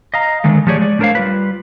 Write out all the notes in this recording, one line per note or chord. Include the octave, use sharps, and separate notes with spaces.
D#5 F5 A#5
D3 D#3 G#3 A3
F3 A3 G4 G#4 C#5 D5
G#3 D5
A3 D4 A#4 C5 C#5 F5
G3 F4 B4